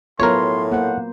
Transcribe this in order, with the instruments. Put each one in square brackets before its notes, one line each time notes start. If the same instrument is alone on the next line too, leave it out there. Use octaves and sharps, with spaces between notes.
[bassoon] A2 [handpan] F#3 B3 F4 [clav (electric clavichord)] A#4 C#5 [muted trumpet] C6
[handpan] A#3 C5 [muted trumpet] F#5